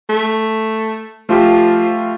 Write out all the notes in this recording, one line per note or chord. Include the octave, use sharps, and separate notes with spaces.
A3
F3 A3 F4 G4